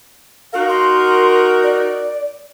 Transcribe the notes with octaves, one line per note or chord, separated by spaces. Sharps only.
D#4 F#4 A#4 F5
C6
D5